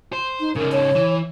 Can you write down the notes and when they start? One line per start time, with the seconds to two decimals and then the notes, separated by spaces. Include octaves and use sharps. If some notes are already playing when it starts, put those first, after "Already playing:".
0.13 C5
0.40 D#4
0.56 C#3 D#4 A#4
0.72 C#5
0.95 E3